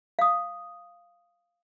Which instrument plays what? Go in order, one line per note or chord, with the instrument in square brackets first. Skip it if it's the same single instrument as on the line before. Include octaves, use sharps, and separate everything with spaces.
[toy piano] F5 D#6